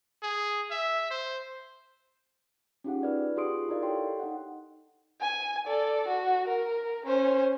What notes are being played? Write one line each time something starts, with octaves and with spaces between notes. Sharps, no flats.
G#4
E5
C5
C#4 D#4 F4 G4 G#4 F#5
D#4 B4 D5
F4 G4 G#4 C6 D#6 D7
D#4 E4 A#4 D5 D#5 F5
G4 A4 C#5 G5 C6
D#4 D#5 F#5
G#5
A4 D5
F#4
A#4
C#4 C5